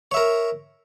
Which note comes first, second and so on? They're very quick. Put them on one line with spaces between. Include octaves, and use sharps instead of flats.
C#5 E5 A#4